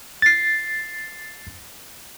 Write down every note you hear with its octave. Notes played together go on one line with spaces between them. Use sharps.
A6 C7